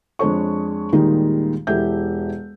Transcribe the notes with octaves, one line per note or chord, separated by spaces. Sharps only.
F2 G#3 D4 C#5 C#6
D#2 A#2 D#3 G3 G#3 D#4
E1 E3 G4 A4 E5 G6